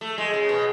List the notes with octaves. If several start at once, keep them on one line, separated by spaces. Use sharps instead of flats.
A3
G#3
C#3
B2